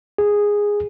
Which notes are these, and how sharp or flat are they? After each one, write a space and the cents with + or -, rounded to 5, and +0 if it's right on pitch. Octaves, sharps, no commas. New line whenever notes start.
G#4 -10